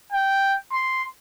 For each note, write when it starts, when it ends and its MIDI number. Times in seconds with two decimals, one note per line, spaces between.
0.12 0.56 79
0.72 1.04 84